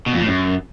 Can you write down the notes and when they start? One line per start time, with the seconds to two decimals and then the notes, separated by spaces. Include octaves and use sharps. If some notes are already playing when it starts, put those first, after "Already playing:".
0.06 B2
0.13 F2
0.20 A2
0.27 F#2